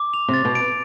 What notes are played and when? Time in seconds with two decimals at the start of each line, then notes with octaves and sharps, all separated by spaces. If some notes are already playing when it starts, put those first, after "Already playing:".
Already playing: D6
0.14 F7
0.28 C3
0.34 A6
0.45 B2
0.55 D7